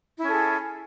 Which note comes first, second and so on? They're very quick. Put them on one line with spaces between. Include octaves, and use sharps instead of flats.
E4 C#4 A4 G#4